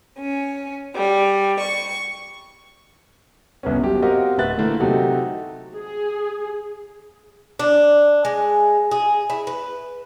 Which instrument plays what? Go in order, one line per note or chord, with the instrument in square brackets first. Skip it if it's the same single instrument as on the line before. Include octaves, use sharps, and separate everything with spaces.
[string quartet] C#4
G3
C#6
[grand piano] G1 C2 B3 C#4
G1 F#3 G4
C4 F#4 G4 A#4 D#5 F5
D1 B4 E5 F#6 A6
A#2 D3 E3 A3 A#3
C3 F#3 D#4 F#4 A4
[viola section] G#4
[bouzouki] D4
G#3
G#4
E4
B4